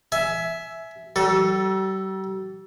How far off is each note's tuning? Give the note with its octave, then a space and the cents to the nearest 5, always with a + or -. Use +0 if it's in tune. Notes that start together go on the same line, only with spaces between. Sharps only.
E5 +0 G#5 +20
G3 -45 A4 +0